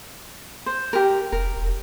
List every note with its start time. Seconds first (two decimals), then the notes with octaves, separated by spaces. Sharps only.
0.66 C5
0.93 G4 A#4
1.32 F1 A#4
1.56 E1